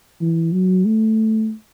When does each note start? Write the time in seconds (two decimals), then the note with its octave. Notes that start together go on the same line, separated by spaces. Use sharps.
0.21 E3
0.53 F#3
0.86 A3